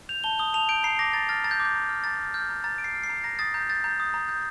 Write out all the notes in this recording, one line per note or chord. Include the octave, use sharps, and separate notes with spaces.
G6 F7
A5 G7
D#6 G7
A5 F7
G6 D7
A#5 C7
D6 A#6
A#5 A6
F6 A6
A#5 A6
G6
D6
G6
A#5
F6
A#5 A6
F6
F6 G6
A#5
A#5 A6
F6 D7
C7
F6
C7
A#5
A#5 A#6
D#6 A6
A#5 G6
G6 A6
A#5 G6
D#6
A#5
G6